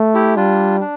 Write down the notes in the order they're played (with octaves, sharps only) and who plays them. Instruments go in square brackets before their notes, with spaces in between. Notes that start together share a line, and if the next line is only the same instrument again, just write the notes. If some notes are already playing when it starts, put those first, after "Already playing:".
Already playing: [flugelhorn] A3
[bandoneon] E4 G4
[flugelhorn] G3 [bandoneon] D4 F4
[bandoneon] D4